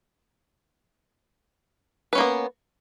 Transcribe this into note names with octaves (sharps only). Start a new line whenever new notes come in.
A#3 B3 C#4 B4